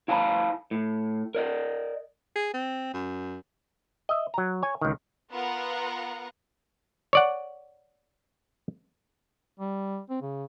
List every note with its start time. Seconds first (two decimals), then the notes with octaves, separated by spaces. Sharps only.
0.08 E4 F5 G#5 A5 B5
0.71 A2
1.35 A#4 D5 D#5
2.36 G#4
2.54 C4
2.94 F#2
4.09 D#5 E5
4.34 F#3 A#5
4.63 C#5 G#5
4.81 C#2 D#3
5.32 B3 F4 A#4 F#5 A#5
7.13 C#5 D5 F#5
9.60 G3
10.10 C4
10.22 C#3